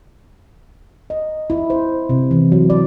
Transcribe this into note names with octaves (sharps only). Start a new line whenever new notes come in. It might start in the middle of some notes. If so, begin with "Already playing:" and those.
D#5
E4
C5
C3
E3
F#3
D5